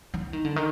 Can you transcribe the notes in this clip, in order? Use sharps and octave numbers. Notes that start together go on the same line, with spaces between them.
E3
D#3
D3
D#3